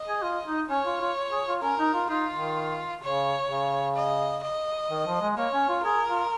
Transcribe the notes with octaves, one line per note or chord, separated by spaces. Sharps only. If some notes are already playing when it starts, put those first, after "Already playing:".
Already playing: D#5
G#4
F4
D#4
C#4 C#5
F4
F4
G#4
F4
C#4 A#4
D#4
F4
D#4 F4
D#3
C#3 C#5
C#3
D#5
D#5
D#3
F3
G#3
A#3 C#5
C#4
F4
G#4 A#4
F4